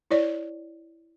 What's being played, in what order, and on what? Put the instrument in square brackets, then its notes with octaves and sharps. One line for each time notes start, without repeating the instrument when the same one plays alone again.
[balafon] E4 C#5 D5